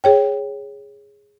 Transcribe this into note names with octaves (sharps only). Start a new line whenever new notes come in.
G#4 C#5 G5